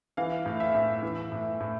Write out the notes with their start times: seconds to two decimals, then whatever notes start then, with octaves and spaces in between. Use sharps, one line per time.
0.17 E3 F5
0.46 A2
0.60 E5
0.75 A2
1.02 E3
1.32 A2
1.60 A2